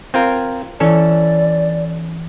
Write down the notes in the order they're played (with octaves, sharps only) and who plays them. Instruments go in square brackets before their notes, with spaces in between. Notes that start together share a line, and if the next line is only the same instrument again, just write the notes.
[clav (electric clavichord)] C4 F4 A#4 [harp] G#6
[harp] E3 [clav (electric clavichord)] C#4 A4 [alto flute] D5